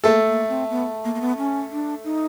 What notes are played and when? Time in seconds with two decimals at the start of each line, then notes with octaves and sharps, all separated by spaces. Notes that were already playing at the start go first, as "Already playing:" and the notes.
0.04 A3 A#3 A4
0.27 A#3
0.49 C4
0.70 B3
1.04 A#3
1.15 A#3
1.21 B3
1.38 C#4
1.71 D4
2.04 D#4